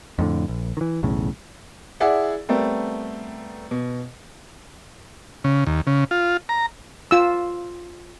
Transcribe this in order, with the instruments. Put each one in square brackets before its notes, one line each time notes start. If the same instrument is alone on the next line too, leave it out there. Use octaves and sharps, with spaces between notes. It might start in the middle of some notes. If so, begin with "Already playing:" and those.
[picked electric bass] F2 A2 D3
A#1
D#3 E3
B1 E2 A2 C#3
[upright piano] E4 G#4 D5 E5 F#5
G3 A3 B3 C4 A#4
B2
[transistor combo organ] C#3
D#2
C#3
F4
A#5
[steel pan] F4 E6